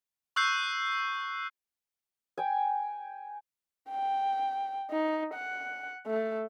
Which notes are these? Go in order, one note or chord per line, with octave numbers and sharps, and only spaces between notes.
C#6 E6 F#6 G6 C7
G5 G#5
G5
D#4
F#5
A3